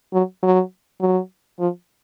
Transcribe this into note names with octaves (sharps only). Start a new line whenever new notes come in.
F#3
F#3
F#3
F3